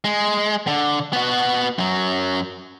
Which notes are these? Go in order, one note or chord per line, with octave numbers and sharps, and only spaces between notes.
G#3
D3
B3 F#4
F#2 F#3